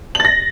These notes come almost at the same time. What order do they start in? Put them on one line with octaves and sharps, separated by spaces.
F#7 A6 A#6